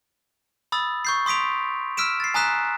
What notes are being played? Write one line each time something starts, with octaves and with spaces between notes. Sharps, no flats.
B5 D#6 E6 A6
C#6 G6 C7
C6 D#6 B6 D7 F7
E6 F6 B6 D7 E7
A6 C7
G#5 A#5 D#6 F#6 B6 E7